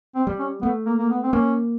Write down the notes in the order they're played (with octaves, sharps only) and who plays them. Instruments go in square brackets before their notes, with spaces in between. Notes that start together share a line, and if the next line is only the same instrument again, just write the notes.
[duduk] C4
[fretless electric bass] G3
[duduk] C#4
[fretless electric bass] A3 [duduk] B3
[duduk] A#3
A#3
B3
C4
[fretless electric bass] A#3 [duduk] C#4